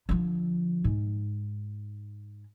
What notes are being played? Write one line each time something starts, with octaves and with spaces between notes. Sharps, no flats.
D3 F3
G#2